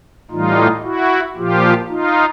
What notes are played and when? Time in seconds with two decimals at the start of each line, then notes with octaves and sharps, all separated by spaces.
0.31 A2 E3 G3 D#4 F4
0.83 E4 F#4
1.36 A#2 F3 F4 G4
1.88 D#4 F4